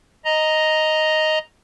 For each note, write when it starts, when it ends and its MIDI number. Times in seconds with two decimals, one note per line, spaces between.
0.25 1.39 75
0.25 1.39 82